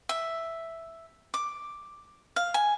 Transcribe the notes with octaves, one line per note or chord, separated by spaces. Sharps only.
E5
D6
F5
G#5